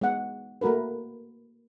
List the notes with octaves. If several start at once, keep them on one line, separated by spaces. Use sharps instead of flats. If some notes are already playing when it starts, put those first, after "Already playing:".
G#3 B3 F#5
A3 A#3 F#4 A#4 B4